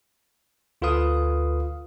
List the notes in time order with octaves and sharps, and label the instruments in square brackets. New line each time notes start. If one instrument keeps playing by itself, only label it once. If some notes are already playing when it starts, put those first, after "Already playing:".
[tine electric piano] D2 F4 A4 B4 F5 D#6